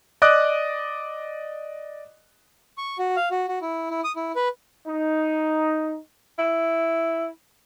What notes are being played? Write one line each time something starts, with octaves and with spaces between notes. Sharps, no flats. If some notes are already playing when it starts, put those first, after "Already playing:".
D5 D#5 D6 D#6 F#6
C#6
F#4
F5
F#4
F#4
E4
E4
D#6
E4
B4
D#4
E4